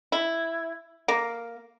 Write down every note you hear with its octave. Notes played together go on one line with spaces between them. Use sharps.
E4
A#3